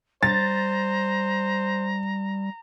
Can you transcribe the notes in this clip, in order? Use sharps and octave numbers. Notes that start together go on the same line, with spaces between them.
G3 C5 A#5 A6